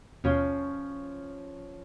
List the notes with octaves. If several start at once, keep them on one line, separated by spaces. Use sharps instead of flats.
D#2 B2 F3 C#4 F4